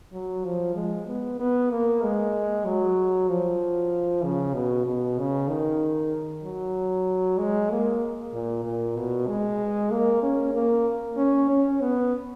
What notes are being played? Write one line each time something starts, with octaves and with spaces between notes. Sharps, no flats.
F#3
F3
G#3
B3
B3
A#3
G#3
F#3
F3
C#3
B2
B2
C#3
D#3
F#3
G#3
A#3
A#2
A#2
B2
G#3
A#3
C#4
A#3
C#4
C#4
B3